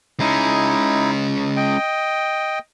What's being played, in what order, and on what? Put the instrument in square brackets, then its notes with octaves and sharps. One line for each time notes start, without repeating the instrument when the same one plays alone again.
[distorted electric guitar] G#3 C#4 [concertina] D#4 E4
[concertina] D#5 G5